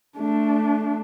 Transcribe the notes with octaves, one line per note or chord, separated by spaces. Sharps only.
A3 D4